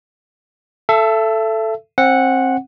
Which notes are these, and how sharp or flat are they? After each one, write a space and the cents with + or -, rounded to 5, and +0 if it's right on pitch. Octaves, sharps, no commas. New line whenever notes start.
A4 +0 E5 +30
C4 +25 F#5 -5